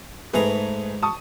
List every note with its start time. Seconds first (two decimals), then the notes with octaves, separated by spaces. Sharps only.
0.34 G#2 A3 G#4 B4 A#5
1.02 A5 C#6 D#6